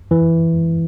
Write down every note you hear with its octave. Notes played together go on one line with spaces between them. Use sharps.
E3